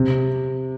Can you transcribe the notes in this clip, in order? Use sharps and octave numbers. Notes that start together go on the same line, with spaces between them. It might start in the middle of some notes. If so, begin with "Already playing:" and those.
Already playing: C3